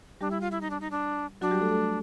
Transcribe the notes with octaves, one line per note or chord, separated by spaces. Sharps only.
G3 D4 G4
E4
F4
E4
D#4
D4
D#4
D4
F#3 D4 F#4
G3 G4
A3 A4
A3 A4